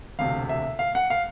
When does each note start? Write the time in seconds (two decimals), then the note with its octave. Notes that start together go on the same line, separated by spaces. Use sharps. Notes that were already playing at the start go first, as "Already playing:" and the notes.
0.19 E1 D2 C3 F5
0.49 E5
0.79 F5
0.95 F#5
1.10 F5